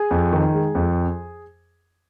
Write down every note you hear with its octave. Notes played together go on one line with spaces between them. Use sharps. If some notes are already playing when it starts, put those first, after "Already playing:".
Already playing: G#4 G#5
F2
D#3
G#3
F2